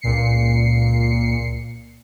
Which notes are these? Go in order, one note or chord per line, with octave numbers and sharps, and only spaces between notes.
C#2 A#2 C7 C#7